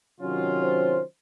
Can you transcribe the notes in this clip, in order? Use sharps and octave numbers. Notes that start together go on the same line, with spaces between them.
C3 D#3 F#3 C#4 F4
C5